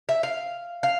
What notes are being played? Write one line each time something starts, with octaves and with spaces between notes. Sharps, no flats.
E5
F5
F5